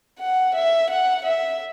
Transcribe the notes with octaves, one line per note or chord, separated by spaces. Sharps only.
F#5
E5
F#5
E5